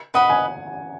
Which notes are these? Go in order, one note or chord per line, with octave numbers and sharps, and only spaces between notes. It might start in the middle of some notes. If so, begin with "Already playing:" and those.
B4 D#5 F#5 B5
G#5